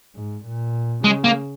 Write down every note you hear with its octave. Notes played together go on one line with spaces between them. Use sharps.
G#2
A#2
C#3 G#3
A#3